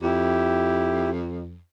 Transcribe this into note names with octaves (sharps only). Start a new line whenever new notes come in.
F2 E4 G4